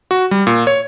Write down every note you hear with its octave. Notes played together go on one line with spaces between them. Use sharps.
F#4
G3
A#2
C#5